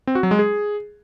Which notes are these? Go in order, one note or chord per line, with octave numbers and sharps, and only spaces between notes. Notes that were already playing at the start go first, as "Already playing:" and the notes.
C4
F#4
F#3
G#3
G#4